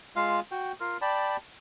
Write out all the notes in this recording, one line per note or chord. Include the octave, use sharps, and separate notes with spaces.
G#3 F4 F5
F#4 G5
F4 A#4
D5 G5 A5 B5